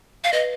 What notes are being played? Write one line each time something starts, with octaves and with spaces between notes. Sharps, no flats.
F5
B4 D#5